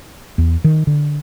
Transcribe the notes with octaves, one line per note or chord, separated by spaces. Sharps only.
E2
D#3
D3